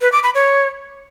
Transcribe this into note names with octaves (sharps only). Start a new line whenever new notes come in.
B4
D6
B5
C#5